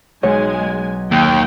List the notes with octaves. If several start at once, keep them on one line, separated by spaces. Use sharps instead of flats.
B1 G#3 C#5 G#5
D#2 G5